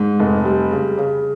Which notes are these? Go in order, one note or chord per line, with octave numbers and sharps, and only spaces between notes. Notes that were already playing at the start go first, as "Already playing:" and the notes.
Already playing: G#2
F1
G3
C#3
C#3